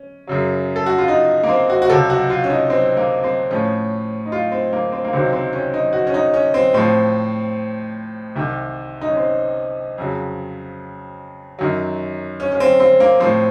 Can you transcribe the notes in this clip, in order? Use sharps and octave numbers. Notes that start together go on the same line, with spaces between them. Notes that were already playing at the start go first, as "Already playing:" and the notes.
Already playing: C#4
F#2 C#3 F#3
A4
F#4
F4
D#4
A#3
C4
F#4
F#4
C#2 C3 F#3 A4
F#4
F4
C#4
D#4
C4
A#3
C4
A2 F3 C#4
D#4
F4
C4
A#3
C4
A#3
C#2 C3 D#3 F#3 C4
C4
C#4
D#4
F#4
C#4
D#4
C#4
C4
A2 F3 C4
C2 C3 D#3
D#4
C#4
C4
F2 C#3 F#3
F#2 D#3 F#3
C#4
C#4
C4
C4
A#3
A2 F3 C4